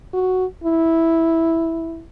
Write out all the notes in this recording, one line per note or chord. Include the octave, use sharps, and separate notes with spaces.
F#4
E4